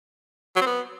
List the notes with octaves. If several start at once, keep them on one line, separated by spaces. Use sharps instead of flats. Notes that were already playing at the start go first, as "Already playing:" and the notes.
F#3
C4
B3